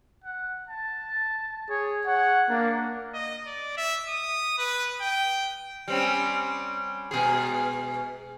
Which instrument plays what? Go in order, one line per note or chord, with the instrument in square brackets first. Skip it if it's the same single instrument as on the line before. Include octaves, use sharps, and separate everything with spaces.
[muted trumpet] F#5
A5
[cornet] G#4 [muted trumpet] C#5
[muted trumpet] C#5 [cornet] F#5
[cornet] A#3 [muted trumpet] D4
[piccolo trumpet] D#5
D5
E5
D#6
B4
G5
[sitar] G3 C4 C#4
B2 G#3 G#4